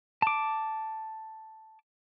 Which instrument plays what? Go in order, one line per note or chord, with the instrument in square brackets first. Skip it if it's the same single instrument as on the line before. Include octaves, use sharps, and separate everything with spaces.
[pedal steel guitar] A5 D6